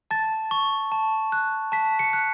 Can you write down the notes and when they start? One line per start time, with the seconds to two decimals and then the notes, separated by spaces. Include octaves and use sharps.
0.11 A5 A6
0.51 C#6
0.92 A5
1.32 F#6
1.72 A5 B6
1.99 C#7
2.13 F#6